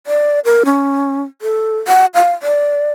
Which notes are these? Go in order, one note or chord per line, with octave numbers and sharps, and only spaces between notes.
D5
A#4
C#4
A4
F#5
F5
D5